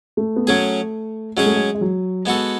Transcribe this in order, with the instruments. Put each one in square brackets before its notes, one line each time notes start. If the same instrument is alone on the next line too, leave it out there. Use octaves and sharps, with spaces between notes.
[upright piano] A3
B3
[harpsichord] F#3 C#4 G#4 [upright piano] A3
[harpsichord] F#3 C#4 G#4 [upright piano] G#3
[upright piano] A3
G#3
G#3
F#3
[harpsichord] G#3 B3 F#4 A4